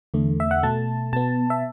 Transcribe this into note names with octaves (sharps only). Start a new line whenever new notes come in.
E2 D3 A3
E5
F#5
B2 A3 A5
B2 B3 A5
E5